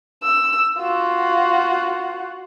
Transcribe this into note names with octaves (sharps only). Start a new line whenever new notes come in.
E6
F4 F#4